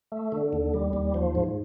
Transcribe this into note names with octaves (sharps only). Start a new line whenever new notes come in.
A3
D3
D#2
G3
D#2
F3
G#2